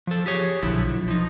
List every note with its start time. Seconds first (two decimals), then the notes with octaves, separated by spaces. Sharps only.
0.07 F3 A4
0.26 G4 G#4 C#5
0.62 B1 A#2 D3 F3 E4
1.08 F3 D#4